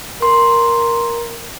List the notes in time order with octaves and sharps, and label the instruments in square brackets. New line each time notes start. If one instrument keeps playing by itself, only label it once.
[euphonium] A#4 [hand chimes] C6